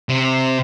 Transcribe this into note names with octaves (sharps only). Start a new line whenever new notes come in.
C3